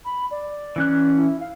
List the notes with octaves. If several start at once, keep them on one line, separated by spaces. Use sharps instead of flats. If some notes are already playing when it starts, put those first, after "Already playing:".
B5
D5
E3 C#4 F#6
E4
F5